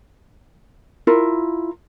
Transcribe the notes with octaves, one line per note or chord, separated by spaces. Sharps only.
E4 F4 A#4